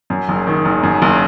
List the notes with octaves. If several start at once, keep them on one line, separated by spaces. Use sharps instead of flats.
F#2
F#1
D#3
F#1
F#2
F#1